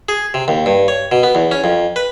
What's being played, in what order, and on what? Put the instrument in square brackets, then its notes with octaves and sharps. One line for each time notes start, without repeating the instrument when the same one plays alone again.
[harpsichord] G#4
C3
D#2
G2
C#5
B2
B3
E2
C#4
F2
B4